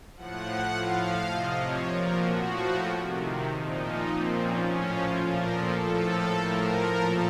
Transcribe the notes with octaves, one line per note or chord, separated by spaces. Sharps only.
A2 F3 F#5
A2 F3 F5
C3 F3 D#5
C#5
A#2 F3 A#4
F#4
A2 F3
C3 D#3
A#2 F3 D#4
D#4
A#2 F3 C4
C#4
A2 F3
F4
A#2 F3 A#4
A4
A2 F3 A4
A2 F3 A#4
A#2 F3 A4